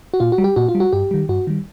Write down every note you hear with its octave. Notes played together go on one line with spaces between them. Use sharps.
F#4
A#2 F4
F#4
G3
G4
A#2 F#4
F4
G3
F#4
G2 G4
D#3 G3
G2 F#4
D#3 G3